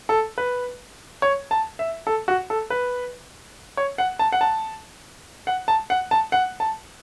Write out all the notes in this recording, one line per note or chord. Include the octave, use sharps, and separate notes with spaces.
A4
B4
C#5
A5
E5
A4
F#4
A4
B4
C#5
F#5
A5
F#5
A5
F#5
A5
F#5
A5
F#5
A5